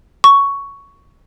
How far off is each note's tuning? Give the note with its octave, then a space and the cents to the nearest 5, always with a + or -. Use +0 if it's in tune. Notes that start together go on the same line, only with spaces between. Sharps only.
C#6 +10